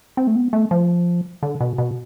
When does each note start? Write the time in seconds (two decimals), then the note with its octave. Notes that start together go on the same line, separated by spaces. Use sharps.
0.17 C4
0.27 A3
0.36 B3
0.53 A3
0.71 F3
1.43 D3
1.60 B2
1.78 B2